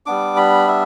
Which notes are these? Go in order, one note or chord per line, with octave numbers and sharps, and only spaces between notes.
G3 B3 D4 D6
B5
E5